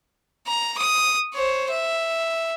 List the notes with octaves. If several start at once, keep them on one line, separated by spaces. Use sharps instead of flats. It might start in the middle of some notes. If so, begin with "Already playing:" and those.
A#5
D#6
C5 C#5
E5